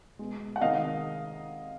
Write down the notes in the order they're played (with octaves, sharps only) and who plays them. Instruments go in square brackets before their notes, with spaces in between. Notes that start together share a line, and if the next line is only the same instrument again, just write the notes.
[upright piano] B2 G#3
F#5
C3 D#3 G#3 D#5 F5